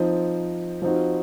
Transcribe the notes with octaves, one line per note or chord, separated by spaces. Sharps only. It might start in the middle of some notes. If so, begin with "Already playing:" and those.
Already playing: F3 C4 D#4
F3 C4 D#4 F#4